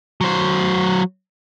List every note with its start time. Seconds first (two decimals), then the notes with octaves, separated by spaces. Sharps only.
0.21 F#3 C5